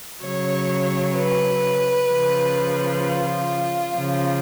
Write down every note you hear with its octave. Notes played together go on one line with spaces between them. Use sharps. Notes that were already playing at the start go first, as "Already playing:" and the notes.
C#3 F#3 C#5
B4
C#3 F3
F4
C#3 F3